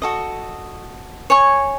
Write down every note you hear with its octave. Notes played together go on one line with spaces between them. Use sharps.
F#4 A4 D#5
C#5 G#5 C#6